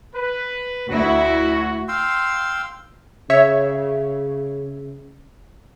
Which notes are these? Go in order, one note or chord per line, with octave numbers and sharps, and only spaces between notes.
B4
D2 E4 F#4
F5 G5 C6 E6
C#3 C#5 E5